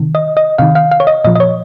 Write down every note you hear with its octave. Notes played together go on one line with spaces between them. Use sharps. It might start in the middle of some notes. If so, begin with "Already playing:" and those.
Already playing: C3 D#3
D#5
D#5
C3 D#3 F5
F5
F5
C#5
D#5
A#2 F3 D#5
D#5
C#5